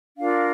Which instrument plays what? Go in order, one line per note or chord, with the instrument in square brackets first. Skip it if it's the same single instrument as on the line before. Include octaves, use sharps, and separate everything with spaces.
[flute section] D4 F4 A#4 F5